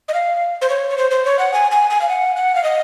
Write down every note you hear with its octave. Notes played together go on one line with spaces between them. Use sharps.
D#5
F5
C5
C#5
C#5
C5
C5
C#5
F#5
G#5
G#5
G#5
F5
F#5
F#5
F5
D#5